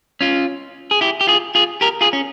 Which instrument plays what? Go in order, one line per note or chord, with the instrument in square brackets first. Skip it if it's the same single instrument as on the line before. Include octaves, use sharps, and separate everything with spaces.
[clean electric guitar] C#4 F4
G#4
E4 G4
G4
F4 G#4
F4 G#4
G4 A#4
F4 G#4
C#4